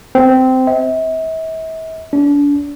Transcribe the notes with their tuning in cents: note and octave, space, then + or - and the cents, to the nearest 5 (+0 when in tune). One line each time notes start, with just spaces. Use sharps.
C4 -15
E5 -40
D4 -35